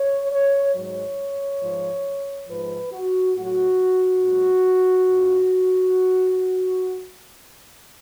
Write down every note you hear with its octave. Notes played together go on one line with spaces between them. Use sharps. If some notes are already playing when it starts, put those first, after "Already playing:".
Already playing: C#5
C#5
G#2 F#3 C#5
G#2 F3
G#2 F3 B4
F#4
A2 F#3 F#4
G#2 F#3
F2 F3